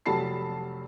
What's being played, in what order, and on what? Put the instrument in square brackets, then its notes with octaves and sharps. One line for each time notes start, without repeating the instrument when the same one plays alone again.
[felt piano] F1 F#3 G3 A5 B5 C7